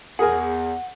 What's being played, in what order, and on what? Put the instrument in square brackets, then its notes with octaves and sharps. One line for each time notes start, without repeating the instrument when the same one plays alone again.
[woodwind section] E2 [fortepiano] G#4 A#4 G#5 [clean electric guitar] F#5